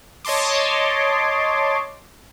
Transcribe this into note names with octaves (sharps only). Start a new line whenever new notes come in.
C#5 D#5 A5 C6 D6